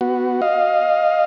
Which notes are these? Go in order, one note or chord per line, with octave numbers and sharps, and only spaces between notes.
B3 F#4
D#5 F5